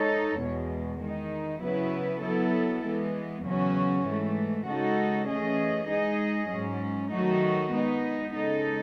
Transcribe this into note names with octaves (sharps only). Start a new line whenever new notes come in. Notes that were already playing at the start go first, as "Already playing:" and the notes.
Already playing: G#3 D#4 A4 C#5
E2 B2 G#3
D#3 G#3 D#4
C#3 F#3 B3 E4 B4
F#3 B3 E4 A4
E3 G#3 B3
E2 C#3 F#3 C#4 F#4
G#2 E3 A3
C#3 G#3 D#4 F#4 A4
E3 A3 C#4 G#4 D#5
G#3 D#4 G#4 D#5
G#2 F#3 C#4
D#3 F#3 A3 D#4 F#4
G#3 B3 D#4
C#3 G#3 D#4 A4